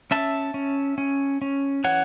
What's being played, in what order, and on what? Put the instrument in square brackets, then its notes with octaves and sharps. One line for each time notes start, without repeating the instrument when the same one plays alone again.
[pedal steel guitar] C#4 E5 A5
C#4
C#4
C#4
E3 C#5 F#5